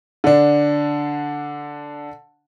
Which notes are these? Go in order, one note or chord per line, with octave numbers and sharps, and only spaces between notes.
D3 D4